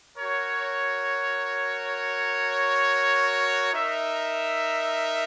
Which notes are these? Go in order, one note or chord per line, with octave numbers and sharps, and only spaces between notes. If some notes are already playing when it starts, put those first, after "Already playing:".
F#4 A#4 C#5
D#4 A#4 E5